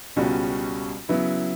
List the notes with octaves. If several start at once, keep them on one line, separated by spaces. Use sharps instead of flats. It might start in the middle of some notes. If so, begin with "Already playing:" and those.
C#2 B2 G3 C#4 F#4
C#3 F#3 B3 E4